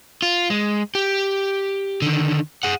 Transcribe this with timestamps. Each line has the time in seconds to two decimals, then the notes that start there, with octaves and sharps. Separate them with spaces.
0.22 F4
0.50 G#3
0.95 G4
2.02 D3 D#3
2.63 G#4 F#5